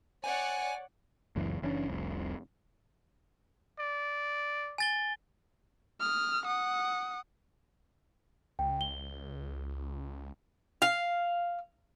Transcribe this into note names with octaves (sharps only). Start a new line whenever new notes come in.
C#5 D5 F#5 G#5
F#1 C#2 F#2 E3
F#1 E3 C#4 D4
F1 C2
D5
G#5 A6 G7
D#6 F6
F#5 D#6
C#2 G5
G7
F5